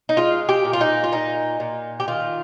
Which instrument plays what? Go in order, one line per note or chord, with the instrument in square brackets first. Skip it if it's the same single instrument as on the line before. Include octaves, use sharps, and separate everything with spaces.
[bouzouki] D#4
G#3 F4
G4
A#2
F4
D#4
F4
A#2 D#4
A#2
G4
D#3 F4